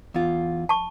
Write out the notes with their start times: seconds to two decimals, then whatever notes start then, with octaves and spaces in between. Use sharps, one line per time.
0.14 E2 F4
0.69 A5 C#6